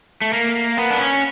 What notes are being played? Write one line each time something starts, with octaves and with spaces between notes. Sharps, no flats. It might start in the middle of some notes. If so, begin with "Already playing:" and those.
A3
A#3
B3
D4
C#4